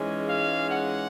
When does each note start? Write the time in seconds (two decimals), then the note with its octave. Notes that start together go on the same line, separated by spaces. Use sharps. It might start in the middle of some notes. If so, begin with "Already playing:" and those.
Already playing: G#2 E3 G#3 C#4
0.27 F5
0.71 F#5